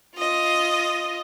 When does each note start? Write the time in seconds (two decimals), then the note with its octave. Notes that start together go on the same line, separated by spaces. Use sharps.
0.16 F4 D#5